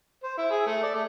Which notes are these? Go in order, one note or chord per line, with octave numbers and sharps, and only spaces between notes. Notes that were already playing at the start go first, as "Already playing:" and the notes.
C5
E4
G#4
A3
D5
A3